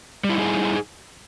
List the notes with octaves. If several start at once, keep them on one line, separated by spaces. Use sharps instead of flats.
G3 D#4 E4 G#4